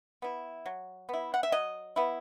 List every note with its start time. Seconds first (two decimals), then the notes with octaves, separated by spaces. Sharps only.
0.22 B3 E4
0.66 F#3
1.09 B3 E4
1.34 F#5
1.43 E5
1.52 F#3 D#5
1.96 B3 E4